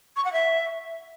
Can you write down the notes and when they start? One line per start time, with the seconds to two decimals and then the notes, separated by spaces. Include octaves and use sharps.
0.16 C#6
0.25 F#5
0.33 E5